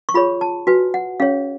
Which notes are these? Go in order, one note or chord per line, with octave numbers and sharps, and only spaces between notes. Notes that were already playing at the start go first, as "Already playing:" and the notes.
C#6
F4 G#4 C#5 B5
A5
F#4 B4 G#5
F#5
C#4 G#4 C#5 F5